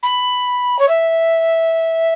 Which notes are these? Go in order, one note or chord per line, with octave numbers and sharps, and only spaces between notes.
B5
C#5
E5